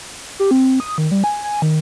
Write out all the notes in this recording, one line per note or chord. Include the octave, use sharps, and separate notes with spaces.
G4
C4
D#6
D#3
G3
G#5
G#5
D#3